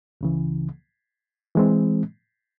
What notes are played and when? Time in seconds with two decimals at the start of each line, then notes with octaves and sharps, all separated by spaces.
0.21 C#2 C#3 E3
1.55 E3 G#3 C4